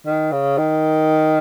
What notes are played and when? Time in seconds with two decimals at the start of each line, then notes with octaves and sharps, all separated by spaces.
0.06 D#3
0.32 C#3
0.58 D#3